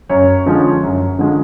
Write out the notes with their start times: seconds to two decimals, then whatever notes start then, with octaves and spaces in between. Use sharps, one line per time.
0.09 F#2 C#5
0.46 D3 F3 G#3 C#4
0.83 F#2
1.19 D3 F3 G#3 C#4